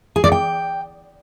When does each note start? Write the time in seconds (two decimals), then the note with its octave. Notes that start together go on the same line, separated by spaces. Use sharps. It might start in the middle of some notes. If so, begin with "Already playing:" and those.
0.16 G#4
0.24 D5
0.32 G5